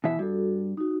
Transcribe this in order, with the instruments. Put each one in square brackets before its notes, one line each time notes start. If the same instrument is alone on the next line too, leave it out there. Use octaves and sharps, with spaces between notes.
[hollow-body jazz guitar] B2 E3 E5
[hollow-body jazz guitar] G2 [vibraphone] F#4 A4
[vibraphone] D#4 F#4